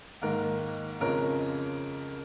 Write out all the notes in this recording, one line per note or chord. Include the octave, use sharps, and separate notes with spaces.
G#2 D#3 A#3 A#4
F2 C#3 F3 G#3 A#4 C#5